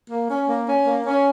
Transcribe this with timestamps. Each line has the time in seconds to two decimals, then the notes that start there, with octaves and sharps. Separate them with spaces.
0.09 A#3
0.29 C#4
0.48 A#3
0.67 C#4
0.86 A#3
1.06 C#4